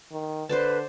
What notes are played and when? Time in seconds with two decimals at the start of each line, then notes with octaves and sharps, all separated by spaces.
0.12 D#3
0.49 D3 B4 C5 D5 A5